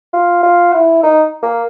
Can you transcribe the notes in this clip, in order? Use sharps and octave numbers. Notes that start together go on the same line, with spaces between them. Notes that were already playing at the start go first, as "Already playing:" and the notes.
F4
F4
E4
D#4
A#3